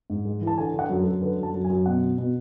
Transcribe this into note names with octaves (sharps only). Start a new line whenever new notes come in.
G#2
G#3
E3
A5
D3 G#5
D3 F#5
F#2
A4
F#2
D3 B4
F#2
A5
F#2
G#5
F#2
B2 F#5
B2
B2